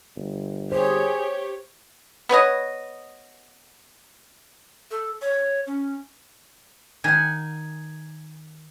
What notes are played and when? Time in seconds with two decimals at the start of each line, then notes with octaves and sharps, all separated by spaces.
0.16 G1
0.72 G4 G#4 C5 C#5
2.29 B3 B4 C#5 D#5
4.91 A4
5.22 C#5
5.67 C#4
7.04 D#3 F#5 G#5